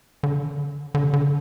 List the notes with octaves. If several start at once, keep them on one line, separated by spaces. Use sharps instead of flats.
D3
D3
C3
D3